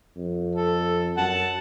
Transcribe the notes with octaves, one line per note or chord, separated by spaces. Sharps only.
F2
A4
F#2 F#5 A5